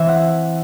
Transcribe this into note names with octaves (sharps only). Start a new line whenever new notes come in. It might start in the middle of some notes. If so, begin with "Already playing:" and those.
Already playing: E3 C4 E5
F#5